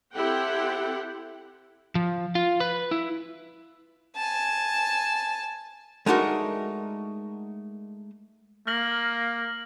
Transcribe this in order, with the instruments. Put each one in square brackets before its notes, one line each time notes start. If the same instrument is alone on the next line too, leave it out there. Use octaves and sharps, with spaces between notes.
[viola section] C4 E4 G4 A4 F#5 G5
[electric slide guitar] F3
F4
B4
E4
[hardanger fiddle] G#5 A5
[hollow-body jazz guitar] G#3 A3 D4 D#4 F#4 A#4
[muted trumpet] A#3 [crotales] F6 A#6 F#7